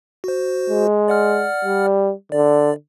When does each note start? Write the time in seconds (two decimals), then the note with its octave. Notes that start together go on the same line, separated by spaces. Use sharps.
0.24 F#4 C5
0.70 G#3
1.08 D5 F#5 F6
1.65 G3
2.32 D3 D5